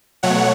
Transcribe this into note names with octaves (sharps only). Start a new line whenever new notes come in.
B2 F#3 A3 C#5 F#5